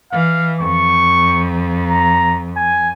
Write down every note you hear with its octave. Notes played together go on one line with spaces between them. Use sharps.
E3 F5
F2 C#6
A#5
G#5